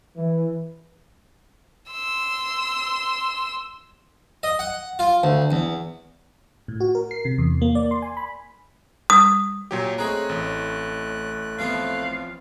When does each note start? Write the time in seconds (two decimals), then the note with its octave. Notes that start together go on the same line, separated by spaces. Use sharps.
0.17 E3
1.91 C6 E6
4.43 D#5
4.59 F#5
4.99 F4
5.23 D2
5.51 E2
6.68 A2
6.80 F#4
6.95 A#4
7.11 C7
7.25 C3
7.38 E2
7.62 A#3
7.75 D5
7.91 C6
8.02 G#5
8.17 B5
9.10 D#6
9.71 A#2 F#3 G4
9.98 A3 C4 D#4 G#4 C#5 A#5 F#6
10.29 A1
11.59 C3 F3 B3 F5